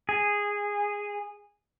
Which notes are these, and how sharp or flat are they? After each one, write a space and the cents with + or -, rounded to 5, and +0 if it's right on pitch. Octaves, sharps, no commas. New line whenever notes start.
G#4 -10